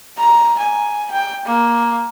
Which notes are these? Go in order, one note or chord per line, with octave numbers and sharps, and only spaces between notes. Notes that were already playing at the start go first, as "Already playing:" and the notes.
A#5
G#5
G5
A#3